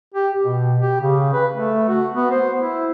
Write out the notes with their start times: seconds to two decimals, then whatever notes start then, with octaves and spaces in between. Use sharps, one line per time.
0.14 G4
0.37 B2
0.81 G4
1.00 C#3
1.33 B4
1.54 A3
1.88 F#4
2.13 B3
2.31 C5
2.56 E4